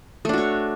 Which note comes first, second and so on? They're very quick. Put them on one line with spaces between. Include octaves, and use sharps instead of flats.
A3 D4 F#4 C#5